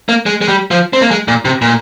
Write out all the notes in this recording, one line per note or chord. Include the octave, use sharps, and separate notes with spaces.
A#3
G#3
G#3
G3
F3
C4
A#3
G#3
A#2
C3
A#2